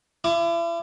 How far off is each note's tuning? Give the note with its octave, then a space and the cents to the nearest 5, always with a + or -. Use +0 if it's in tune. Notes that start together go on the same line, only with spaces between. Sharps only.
E4 +40 D6 +10